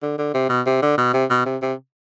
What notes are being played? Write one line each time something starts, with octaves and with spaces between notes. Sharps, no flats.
D3
D3
C3
B2
C3
D3
B2
C3
B2
C3
C3